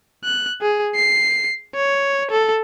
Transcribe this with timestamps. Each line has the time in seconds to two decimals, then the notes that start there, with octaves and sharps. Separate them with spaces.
0.24 F#6
0.62 G#4
0.96 C7
1.75 C#5
2.31 A4